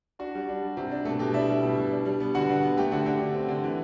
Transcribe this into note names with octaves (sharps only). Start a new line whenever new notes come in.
D4 F#4
G3
D4
G3
C3
D4
B2 A3 A4
B2 G4
D4 E4 E5
G3
B2
B2
D4
G3
B3
D3 F#4 F#5
D3
B3
A3 G4 G5
D3 F#4 F#5
D3 G4 G5
D3
C4
D3
E3